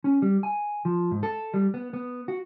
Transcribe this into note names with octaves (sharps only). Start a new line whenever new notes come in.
C#4
G3
G#5
F3
G#2
A4
G3
B3
B3
F#4